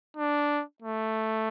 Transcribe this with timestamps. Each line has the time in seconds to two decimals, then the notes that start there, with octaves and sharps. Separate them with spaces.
0.17 D4
0.82 A3